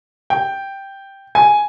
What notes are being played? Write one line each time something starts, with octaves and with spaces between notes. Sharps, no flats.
G5
G#5